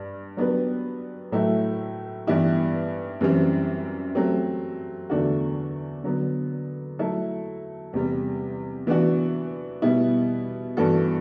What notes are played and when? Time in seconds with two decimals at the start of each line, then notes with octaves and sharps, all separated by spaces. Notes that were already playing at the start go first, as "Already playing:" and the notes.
Already playing: G2 G3
0.37 F#3 B3 D4 G4 B4
1.32 A2 F#3 A3 E4
2.27 G2 E3 B3 E4 G4
3.21 F#2 E3 G3 C4 G4
4.15 F#3 A3 C4 G4
5.10 E2 D3 A3 D4 F#4
6.04 D3 F#3 B3
6.99 F#3 A3 E4 A4
7.93 E2 C3 G3
8.87 E3 B3 D4 F#4
9.82 B2 G3 B3 E4
10.77 G2 E3 B3 F#4 A4